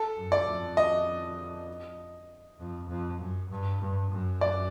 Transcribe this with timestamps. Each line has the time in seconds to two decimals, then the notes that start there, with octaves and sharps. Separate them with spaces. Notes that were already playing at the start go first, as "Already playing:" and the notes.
Already playing: A4
0.16 F#2
0.32 D5
0.47 F2
0.77 D#5
2.60 F2
2.89 F2
3.20 F#2
3.50 G2
3.81 G2
4.11 F#2
4.41 D5